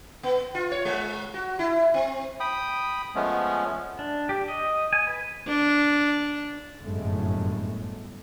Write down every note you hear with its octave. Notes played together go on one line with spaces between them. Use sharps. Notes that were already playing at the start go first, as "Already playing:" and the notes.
B3
F4
C#5
G#3
F#4
E4
C4
G5 B5 D#6
F3 G#3 A3 B3 C#4
D4
G4
D#5
G#5
B4
D4
G1 F#2 A2 G#3 A3